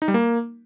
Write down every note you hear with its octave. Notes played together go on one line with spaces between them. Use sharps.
D#4
G3
A#3